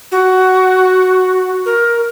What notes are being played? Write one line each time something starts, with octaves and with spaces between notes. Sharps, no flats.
F#4
A#4